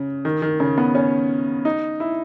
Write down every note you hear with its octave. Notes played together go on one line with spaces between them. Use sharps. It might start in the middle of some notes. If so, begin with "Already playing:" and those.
Already playing: C#3
D#3
D#3
C#3
B3
C#4
D#4
E4